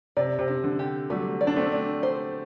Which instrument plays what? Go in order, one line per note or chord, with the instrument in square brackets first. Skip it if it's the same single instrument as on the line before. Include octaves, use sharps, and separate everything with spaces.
[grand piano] C3 [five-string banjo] D5
[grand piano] C3
[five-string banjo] D4
[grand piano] D3
[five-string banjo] G4
[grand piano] F#3 A3 [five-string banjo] G3
[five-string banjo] D5
[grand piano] D4
A3 C4
[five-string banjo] D4
C5